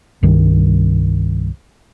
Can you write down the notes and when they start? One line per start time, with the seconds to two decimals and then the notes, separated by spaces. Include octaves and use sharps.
0.23 C2 G2 D#3